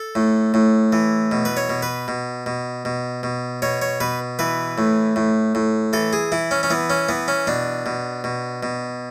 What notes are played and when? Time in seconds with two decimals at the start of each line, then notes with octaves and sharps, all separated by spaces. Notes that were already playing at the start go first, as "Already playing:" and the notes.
Already playing: A4
0.15 A2
0.54 A2
0.93 E3
1.32 B2
1.45 B4
1.57 C#5
1.69 B2
1.83 B4
2.08 B2
2.46 B2
2.85 B2
3.23 B2
3.62 B2 C#5
3.82 C#5
4.00 B2 B4
4.39 E3 B4
4.78 A2
5.16 A2
5.55 A2
5.93 E3 A4
6.13 G#4
6.32 E3 E4
6.51 C#4
6.63 C#4
6.70 E3 B3
6.90 C#4
7.09 E3 B3
7.28 C#4
7.47 B2 D4
7.86 B2
8.24 B2
8.63 B2